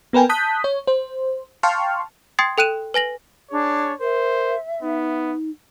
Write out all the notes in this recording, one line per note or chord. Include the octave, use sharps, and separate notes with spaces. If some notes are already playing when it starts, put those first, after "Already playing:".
B3 A#4 B4 G5 G#5
A5 D#6 F#6 G6 B6
C#5
C5
F5 G5 A5 C6 C#6 F6
G5 C6 D#6 G#6 A6 C7
A4 G5 F#6 D#7 E7
B4 G#5 A#6 F#7
D4 G#4 C#5
A#4 C5 E5
B3 D#4